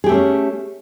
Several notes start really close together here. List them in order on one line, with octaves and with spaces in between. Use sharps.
G#4 G4 A3 C4 C#4